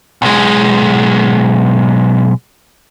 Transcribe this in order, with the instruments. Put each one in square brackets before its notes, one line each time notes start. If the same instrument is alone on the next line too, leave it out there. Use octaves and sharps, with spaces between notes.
[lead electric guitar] B1 G#3